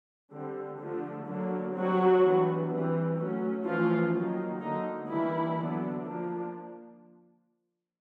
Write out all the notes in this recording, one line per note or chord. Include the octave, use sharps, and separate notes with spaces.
D3 G3 C4
D3 F3 A3 D4
D3 F#3 A#3 D4
F#3 G3 C4 F#4
E3 G3 B3 D4
E3 G3 C4
F#3 A3 C#4
E3 F3 A3 C#4 F4
D#3 F#3 A#3
D3 F#3 A#3 D#4
D#3 E3 G3 A#3 D4 E4
D3 F#3 B3 D4
F3 A#3 D4